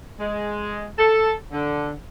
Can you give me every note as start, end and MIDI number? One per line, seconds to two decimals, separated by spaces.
0.19 0.87 56
0.98 1.32 69
1.52 1.91 50